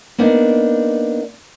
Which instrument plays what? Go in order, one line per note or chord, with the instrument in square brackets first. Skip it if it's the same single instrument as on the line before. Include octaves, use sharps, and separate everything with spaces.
[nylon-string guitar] A#3 B3 D4 D#4